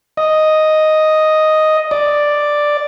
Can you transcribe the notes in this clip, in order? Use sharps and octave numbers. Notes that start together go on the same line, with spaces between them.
D#5
D5